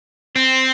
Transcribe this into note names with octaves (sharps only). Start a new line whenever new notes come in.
C4